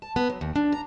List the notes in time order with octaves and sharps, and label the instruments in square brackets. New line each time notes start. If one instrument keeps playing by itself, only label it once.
[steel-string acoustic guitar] A5
B3
F#3
D#2
D4
A#5